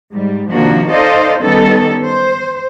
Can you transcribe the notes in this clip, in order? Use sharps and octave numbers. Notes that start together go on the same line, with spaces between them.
G#2 G3
C3 D#3 F3 A#3 D4 F#4
D#4 A4 C5 D5 D#5 F5
D#3 G3 B3 C#4 D#4 A4
C5